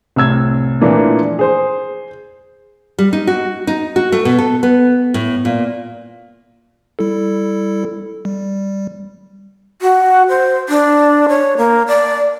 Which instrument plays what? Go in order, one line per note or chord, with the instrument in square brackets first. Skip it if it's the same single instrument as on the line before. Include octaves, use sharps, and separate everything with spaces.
[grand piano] C2 A2 E6 G#6
A#2 E3 F3 A3 A#3 D4
G#4 C5
[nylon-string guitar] G3
D#4
F#4
D#4
F#4
A3
B2
A4
B3
A2
A#2
[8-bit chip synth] G3 E4 A4
G3
[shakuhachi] F#4
C5
D4
C#5
A#3
D5